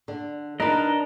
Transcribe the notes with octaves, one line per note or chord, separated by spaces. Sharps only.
D3
D4 D#4 A#4 B4 D#5